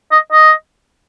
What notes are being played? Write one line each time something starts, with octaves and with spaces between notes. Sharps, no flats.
D#5
D#5